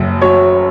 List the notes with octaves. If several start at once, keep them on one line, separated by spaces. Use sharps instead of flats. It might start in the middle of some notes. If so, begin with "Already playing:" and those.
Already playing: F#1 F#2
F#3 C#5